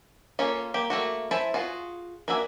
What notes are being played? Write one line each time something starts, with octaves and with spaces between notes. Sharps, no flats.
A#3 C#4 F4 A4
A#3 G4
A3 A#3 F#4
E4 C5 E5 G#5 A5
F4 F#4 G#4
A#3 D4 F#4 E5 G#5